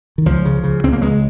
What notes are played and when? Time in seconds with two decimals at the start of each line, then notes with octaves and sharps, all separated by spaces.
0.18 D#3
0.26 C#2 F3
0.45 C#3
0.64 C#3
0.84 C#2 C4
0.93 A#3
1.02 C#2 G#3